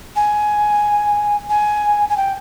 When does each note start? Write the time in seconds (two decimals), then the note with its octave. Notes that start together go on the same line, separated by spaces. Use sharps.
0.16 G#5
1.50 G#5
2.09 G#5
2.17 G5